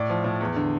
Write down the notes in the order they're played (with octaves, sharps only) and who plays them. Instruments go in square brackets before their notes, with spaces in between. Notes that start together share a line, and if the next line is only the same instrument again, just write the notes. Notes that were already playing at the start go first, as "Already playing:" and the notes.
Already playing: [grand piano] A2 D5
F3
A2
E2
D3